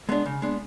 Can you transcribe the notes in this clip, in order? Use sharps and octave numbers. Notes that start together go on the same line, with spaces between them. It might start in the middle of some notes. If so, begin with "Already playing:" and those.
G#3 B3 D4
C#3
G#3 B3 D4